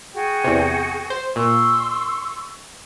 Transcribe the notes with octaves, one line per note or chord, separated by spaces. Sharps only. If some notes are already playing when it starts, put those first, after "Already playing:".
F#4 G#4 G5
E2 C3
C5
A#2 C6 C#6 E6